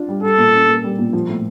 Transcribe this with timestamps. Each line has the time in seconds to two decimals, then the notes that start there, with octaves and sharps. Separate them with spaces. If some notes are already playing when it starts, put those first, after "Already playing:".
Already playing: D4 F4
0.09 G3
0.23 G3 A4
0.38 A#2
0.54 C#4
0.68 A#3
0.84 G3
0.99 A#2
1.13 F3
1.29 A2